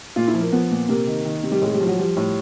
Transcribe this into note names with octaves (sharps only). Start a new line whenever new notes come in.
A#2 F4
E4
F3
A#3
F3 B3
A#2
C3 A#3
D#3
D#3
C3
G3
A2 G#3
G3
F3
F#3
F3 G3
A2